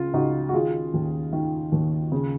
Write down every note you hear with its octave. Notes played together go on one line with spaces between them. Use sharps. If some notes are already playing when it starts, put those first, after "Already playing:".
Already playing: C#2 C#3 F4
C#2 D#4 F#4
F#4
D#3 F4 G#4
D#2
D#3
D#2
C#3